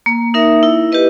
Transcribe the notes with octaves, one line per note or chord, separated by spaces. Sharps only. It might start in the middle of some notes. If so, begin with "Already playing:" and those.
A#3
D#4 A#4 E5
E4
G4 B4 D#5